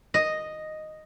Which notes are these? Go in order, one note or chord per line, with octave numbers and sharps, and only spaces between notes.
D#5